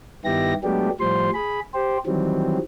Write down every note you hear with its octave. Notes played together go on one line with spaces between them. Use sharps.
G2 D#3 B3 E4 G4 A#6
F#3 G#3 A3 B3 D4 G4
A2 F3 G3 C5 C6
G#4 B5
G4 C5
D#3 E3 F#3 G3 C4